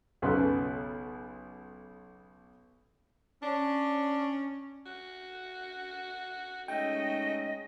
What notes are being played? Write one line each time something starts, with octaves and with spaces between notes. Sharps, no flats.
B1 C#3 C#4 A4 B4 C6
C#4 D4
F#4
G#3 A3 C#4 D#4 D#5 G5